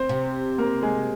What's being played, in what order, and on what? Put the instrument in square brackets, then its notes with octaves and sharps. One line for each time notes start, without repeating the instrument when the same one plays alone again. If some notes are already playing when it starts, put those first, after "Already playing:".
Already playing: [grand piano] C4 C5
[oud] C3
[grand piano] A#3 A#4
G#3 G#4